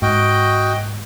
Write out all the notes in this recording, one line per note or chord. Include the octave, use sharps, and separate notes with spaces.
G#2 F#4 D#5 G5